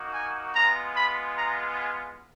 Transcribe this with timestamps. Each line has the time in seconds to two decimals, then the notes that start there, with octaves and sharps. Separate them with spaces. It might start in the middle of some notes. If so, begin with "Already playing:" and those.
Already playing: A#3 D#4 F#4
0.13 G#5
0.54 G#3 B3 F4 A#5
0.95 B5
1.36 A#5
1.77 G#5